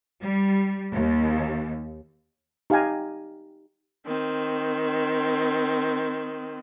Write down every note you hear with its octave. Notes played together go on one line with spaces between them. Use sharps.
G3
D#2
D#4 G4 F5 G5 G#5 A#5
D#3 C4